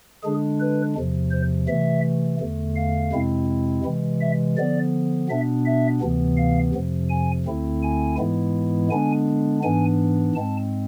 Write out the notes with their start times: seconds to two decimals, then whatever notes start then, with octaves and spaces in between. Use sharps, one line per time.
0.23 D3 G#3 D4 G#4
0.60 B4
0.95 E2 C3 F3
1.31 C5
1.68 C3 E3 A3 E5
2.40 E2 D3 A3
2.76 F5
3.12 F2 C3 G#3 C4 E4
3.84 C3 E3 G#3
4.21 E5
4.57 D3 F3 B3 D5
5.29 B2 B3 D4 E5
5.66 E5
6.01 D2 C3 E3 B3
6.37 F5
6.74 F2 C3 F3
7.10 G#5
7.46 D2 D3 A3 C4 E4
7.83 G#5
8.18 G#2 E3 G#3 B3 E4
8.90 D3 G#3 B3 D4 G#5
9.63 G#2 E3 B3 D4 G#5
10.35 G#2 G#3 C4 A5